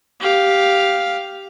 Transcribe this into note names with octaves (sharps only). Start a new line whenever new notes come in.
G4 F5